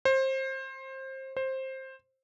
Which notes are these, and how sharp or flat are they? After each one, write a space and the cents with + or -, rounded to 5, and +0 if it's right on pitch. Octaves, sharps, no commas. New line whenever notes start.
C5 +25
C5 +15